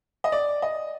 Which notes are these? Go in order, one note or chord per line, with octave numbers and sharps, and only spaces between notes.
D#5
D5
D#5